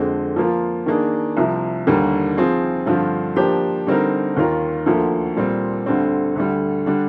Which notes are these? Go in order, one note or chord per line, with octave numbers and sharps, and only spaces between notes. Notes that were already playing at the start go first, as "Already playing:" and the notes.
Already playing: F2 D3 G#3 C4
F3 A#3 F4
D#3 A#3 D4 G#4
C2 C3 F3
D#2 D3 G3 A#3
F3 C4 F4 G#4
G2 D3 F3 C4 F4
F3 A#3 D4 G4 C5
D3 G3 C4 D#4 A#4
D#2 D#3 A#3 F4 A#4
D2 D3 F3 A#3
A#2 G3 C4
D2 D3 G3 C4
D2 D3 G3
D3 G3 D4